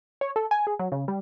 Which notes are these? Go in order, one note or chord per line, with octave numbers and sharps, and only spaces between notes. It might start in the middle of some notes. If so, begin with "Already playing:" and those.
C#5
A4
G#5
G#4
F#3
C#3
G3